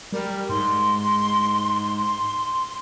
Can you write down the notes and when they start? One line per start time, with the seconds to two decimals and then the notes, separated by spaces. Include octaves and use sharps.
0.12 G3 A#4
0.49 G#2 C6